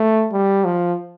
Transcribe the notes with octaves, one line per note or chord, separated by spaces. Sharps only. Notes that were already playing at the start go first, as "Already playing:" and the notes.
Already playing: A3
G3
F3